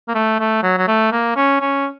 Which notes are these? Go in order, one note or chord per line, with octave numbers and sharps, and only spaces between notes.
A#3
A3
A3
F#3
F#3
A3
A#3
C#4
C#4